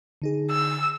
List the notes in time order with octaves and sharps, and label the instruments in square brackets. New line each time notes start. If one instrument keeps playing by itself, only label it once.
[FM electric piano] D3 D#4 G#4
[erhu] E6